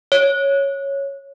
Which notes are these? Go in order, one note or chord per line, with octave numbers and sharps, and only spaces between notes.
C#5